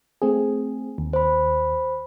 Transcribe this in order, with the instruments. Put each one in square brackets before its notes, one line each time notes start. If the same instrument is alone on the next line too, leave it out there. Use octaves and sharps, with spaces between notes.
[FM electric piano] A3 C4 G#4
D#2
[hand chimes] C5 B5